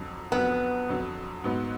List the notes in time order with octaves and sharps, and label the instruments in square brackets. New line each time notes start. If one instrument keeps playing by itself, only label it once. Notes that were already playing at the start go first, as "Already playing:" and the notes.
Already playing: [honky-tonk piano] F2 D3 F#3
[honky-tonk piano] F2 D3 F#3 [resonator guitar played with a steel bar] B3
[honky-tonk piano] F2 D3 F#3
G#2 F#3 B3